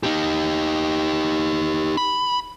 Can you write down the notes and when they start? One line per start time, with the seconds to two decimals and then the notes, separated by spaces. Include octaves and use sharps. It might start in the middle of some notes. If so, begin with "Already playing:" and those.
0.03 D#4 G4
1.97 B5